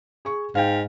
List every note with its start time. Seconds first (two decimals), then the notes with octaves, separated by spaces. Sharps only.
0.25 G#4 C#6
0.55 G#2 F5 G5